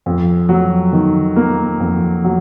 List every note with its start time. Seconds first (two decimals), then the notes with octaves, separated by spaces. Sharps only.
0.06 F2
0.49 F#3
0.93 D#3
1.36 A#3
1.80 F2
2.24 F#3